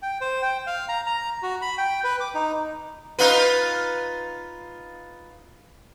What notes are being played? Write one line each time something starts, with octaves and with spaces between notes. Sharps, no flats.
G5
C5
G5
F5
A#5
A#5
F#4
B5
G5
B4
D6
D#4
D#4 F4 B4